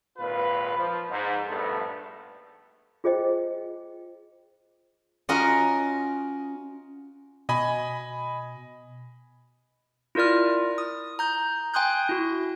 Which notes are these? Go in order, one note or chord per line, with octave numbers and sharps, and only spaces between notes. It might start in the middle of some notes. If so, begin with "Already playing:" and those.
G#1 A#2 F4 B4
F3
G#2
A#1 G2 A3 B3 A4
F4 G#4 C5 D#5 G5
C#4 F4 F#4 A#4 D#5
B2 D#5 G#5 B5
E4 F4 A#4 D5 F6
D#6
A#5 G6
G5 G#5 C6 D#6 F#6 G6
E4 F#4